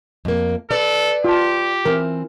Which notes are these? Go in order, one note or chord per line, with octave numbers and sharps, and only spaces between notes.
F2 A#3
A4 B4 D5
F4 G4 A5
E3 C4 A#4